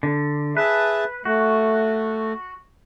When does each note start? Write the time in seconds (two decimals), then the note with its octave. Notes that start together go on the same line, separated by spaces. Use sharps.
0.03 D3
0.57 G#4 B4 E5 A5
1.25 A3 F#4